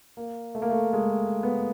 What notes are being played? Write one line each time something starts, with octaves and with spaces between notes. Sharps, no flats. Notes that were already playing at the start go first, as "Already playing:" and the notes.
A#3
A3
A#3
A3
G#3
B3